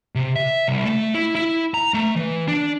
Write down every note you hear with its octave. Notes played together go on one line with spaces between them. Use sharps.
C3
E5
C2
A3
E4
E4
A#5
A3
E3
D4